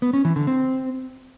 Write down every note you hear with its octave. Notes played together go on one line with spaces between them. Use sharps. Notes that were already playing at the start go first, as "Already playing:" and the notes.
B3
C#4
E3
D3
C4